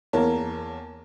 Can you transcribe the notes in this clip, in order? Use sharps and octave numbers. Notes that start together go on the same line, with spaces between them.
E2 A#3 A#4 C#5 A5